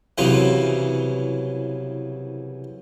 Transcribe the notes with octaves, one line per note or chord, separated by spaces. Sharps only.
C2 C#3 E3 F#3 F#5